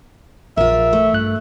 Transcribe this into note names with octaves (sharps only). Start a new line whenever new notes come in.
A#1 F4 A#4 E5
A3
G2 F#6